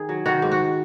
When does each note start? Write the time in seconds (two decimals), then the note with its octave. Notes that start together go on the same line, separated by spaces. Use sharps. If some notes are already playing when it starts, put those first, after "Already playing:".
Already playing: D#3 G#4
0.09 F#3
0.26 D#3 F#4
0.42 G#2
0.52 F#4